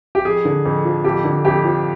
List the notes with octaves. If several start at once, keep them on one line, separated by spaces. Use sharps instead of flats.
G4
F2 G#4
D3
F2
F3
F2 G4
D3
F2 G4
F3